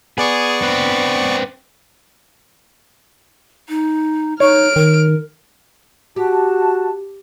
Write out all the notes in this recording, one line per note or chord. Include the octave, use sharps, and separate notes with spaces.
B3 G#4 D5 C#6
C4 B4
D#4
D#4 C#5 F6 D7
D#3 A#4
F#4 G4 A5